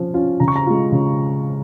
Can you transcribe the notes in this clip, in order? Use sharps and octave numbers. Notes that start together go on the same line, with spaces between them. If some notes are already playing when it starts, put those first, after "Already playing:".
Already playing: F3 C#4 F4
C#4 F4
C#3 A#5
C#6
A#5
G#3 F4
C#3